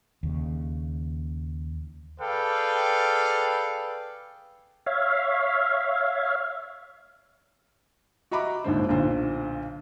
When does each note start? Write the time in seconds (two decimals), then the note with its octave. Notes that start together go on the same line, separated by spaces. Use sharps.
0.23 D#2 C#3
2.21 G#4 A4 B4 D5 F5 G5
4.86 C#5 E5 F5
8.31 F#4 D#5 E5 A#5 B5 D6
8.64 A#1 D#2 G#2 D3 C5
8.89 B1 A#2 D3 C5